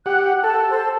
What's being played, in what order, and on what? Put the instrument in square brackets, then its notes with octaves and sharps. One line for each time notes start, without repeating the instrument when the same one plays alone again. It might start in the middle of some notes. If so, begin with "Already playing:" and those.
[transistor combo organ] G4 F#5 [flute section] F#6
[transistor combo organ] A4 [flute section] A5
[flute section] C5